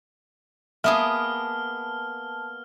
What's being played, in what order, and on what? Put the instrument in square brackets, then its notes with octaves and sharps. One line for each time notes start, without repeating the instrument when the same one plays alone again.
[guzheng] A#3 B3 G#4 [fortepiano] E5 [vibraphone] A5 [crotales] F6